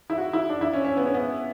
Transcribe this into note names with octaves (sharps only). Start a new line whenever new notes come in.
E4
F#4
E4
D4
E4
C#4
C#4
B3
C#4
B3